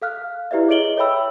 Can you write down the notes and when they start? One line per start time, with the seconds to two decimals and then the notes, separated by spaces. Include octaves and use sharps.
0.02 A4 F5 F6 F#6
0.51 E4 G4 B4 D5 E5
0.68 G#4 C#5 D#5 D7 F#7 G7
0.97 A4 C#5 E5 G5 B5 E6